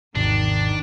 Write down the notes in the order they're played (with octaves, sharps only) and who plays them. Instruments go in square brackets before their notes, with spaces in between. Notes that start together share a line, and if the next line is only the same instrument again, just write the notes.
[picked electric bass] G#1 [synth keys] E2 C3 [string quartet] D#3 [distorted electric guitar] D4